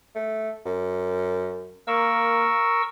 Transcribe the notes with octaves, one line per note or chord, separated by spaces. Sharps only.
A3
F#2
A#3 A#4 C#6 E6